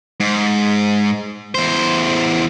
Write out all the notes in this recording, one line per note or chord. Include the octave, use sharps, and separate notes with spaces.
G#2
E2 C5